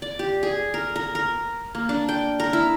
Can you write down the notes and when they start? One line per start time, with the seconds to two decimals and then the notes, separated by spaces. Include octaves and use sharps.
0.02 D5
0.19 G4
0.43 G#4
0.74 A#4
0.96 A#4
1.15 A#4
1.75 A#3
1.89 D4
2.09 G5
2.40 A#4
2.53 E4